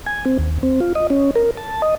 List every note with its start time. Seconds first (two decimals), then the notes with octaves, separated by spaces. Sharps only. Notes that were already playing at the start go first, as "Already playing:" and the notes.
0.06 G#5
0.25 C4
0.39 D#2
0.63 C4
0.80 F4
0.95 D#5
1.10 C#4
1.35 A#4
1.57 A5
1.82 D#5